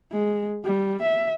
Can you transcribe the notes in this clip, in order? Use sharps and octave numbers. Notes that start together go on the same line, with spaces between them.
G#3
G3
E5